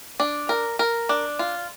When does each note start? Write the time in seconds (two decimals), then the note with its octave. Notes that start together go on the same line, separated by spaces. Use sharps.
0.20 D4
0.49 A#4
0.79 A#4
1.09 D4
1.39 F4